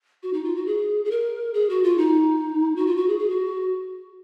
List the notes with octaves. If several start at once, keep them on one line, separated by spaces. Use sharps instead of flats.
F#4
D#4
F4
F#4
G#4
G#4
A#4
G#4
F#4
F4
D#4
F#4
F4
F#4
G#4
G#4
F#4